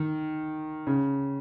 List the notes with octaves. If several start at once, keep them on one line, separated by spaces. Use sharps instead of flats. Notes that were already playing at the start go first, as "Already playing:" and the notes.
Already playing: D#3
C#3